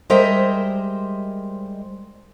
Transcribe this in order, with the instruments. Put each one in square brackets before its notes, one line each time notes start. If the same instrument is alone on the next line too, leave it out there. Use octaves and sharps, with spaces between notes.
[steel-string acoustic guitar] G3 G#3 A#4 C5 D#5 E5